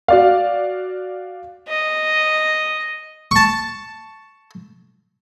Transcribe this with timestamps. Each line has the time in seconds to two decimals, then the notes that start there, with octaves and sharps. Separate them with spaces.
0.08 F#4 D5 F5
1.68 D#5
3.31 A5 C#6